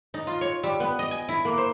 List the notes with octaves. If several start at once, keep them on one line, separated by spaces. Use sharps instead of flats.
D#4
F4
C#5
G3
B3
D#5
G#5
E4
A#3
C5